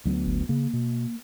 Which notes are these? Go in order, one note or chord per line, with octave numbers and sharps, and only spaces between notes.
D2 F#3 B3
G1
C#3 A#3
B2